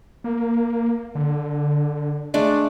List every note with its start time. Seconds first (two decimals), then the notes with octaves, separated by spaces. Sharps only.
0.24 A#3
1.15 D3
2.34 G#3 A3 D4